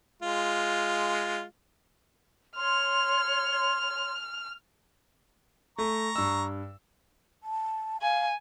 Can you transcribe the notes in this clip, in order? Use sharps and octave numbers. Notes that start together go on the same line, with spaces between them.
G#3 F4
C#5 C6 F6
A3 A#5 C#6
G2 E6
A5
F5 G#5